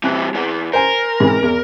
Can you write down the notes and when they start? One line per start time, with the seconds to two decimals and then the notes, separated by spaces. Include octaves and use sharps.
0.03 E3 G3 C4 F#6
0.35 E2 E3
0.73 A#4 C5 G#5
1.20 G#2 E3 C4
1.43 E2